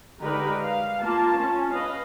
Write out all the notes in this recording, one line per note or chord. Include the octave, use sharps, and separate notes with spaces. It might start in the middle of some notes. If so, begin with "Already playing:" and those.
D3 G#3 D#4 G4 A#4 B4
F5
A#3 F4 A5
C#4
B4 D#5 F5